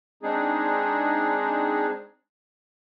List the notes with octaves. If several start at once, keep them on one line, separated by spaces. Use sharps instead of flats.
G#3 C4 D4 D#4 G#4